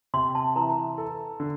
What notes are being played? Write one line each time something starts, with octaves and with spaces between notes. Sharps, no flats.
C3 C6
A5
E3 A#5
A4
D3